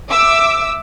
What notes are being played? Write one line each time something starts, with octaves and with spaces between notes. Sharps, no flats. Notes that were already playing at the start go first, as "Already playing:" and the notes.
E5 D6 E6